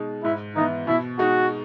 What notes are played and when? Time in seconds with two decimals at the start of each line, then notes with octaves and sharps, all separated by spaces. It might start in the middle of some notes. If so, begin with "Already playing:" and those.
Already playing: B2 G#3 D#4
0.24 G#2 E4
0.56 E3 B3 D#4 E4
0.87 B2 E4
1.19 G#3 D#4 F#4